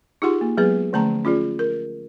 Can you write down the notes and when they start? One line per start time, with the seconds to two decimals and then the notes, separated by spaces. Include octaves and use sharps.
0.22 D#4 F4 G4 G#4 F#5 C6
0.41 A#3
0.57 F#3 G#3 B3 G#4 B4
0.93 D3 F3 A3 C#4 A5 A#5
1.25 C#4 F4 G#4 D5
1.59 A#4